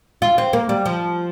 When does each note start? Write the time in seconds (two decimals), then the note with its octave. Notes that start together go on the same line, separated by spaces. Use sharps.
0.22 F4
0.38 C4
0.53 A#3
0.69 G3
0.85 F3